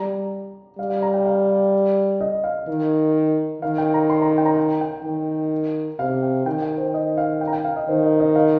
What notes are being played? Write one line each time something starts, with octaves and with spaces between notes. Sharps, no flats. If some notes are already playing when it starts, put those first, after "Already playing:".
Already playing: G3 A#5
G3 F5
F5
A#5
G5
F5
D#5
F5
D#3
D#3 F5
G5
A#5
C6
A#5
G5
A#5
G5
G5
D#3
C3 F5
G5
D#3 G5
G5
C5
D#5
F5
G5
A#5
G5
F5
D#5
D#3 C5
D#5
D#5
F5